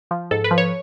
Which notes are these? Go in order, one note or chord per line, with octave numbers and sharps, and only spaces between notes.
F3
G#2 A4
B4
F3
C#5